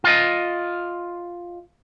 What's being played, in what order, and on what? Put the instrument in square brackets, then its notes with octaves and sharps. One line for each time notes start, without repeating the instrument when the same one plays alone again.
[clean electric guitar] F4 D#5